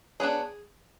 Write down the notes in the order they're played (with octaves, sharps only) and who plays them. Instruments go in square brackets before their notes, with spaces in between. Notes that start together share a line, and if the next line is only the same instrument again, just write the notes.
[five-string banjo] F#3 B3 D4 G#4